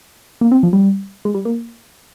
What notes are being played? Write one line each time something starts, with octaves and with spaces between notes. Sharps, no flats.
A#3
C4
F3
G3
G#3
G3
A#3